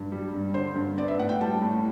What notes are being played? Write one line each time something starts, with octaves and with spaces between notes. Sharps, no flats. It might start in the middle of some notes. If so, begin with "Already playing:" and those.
Already playing: G2
G3
G2
D3 C5
G2
B3 D5
E5
A2 F#5
G5
G3 A5
A2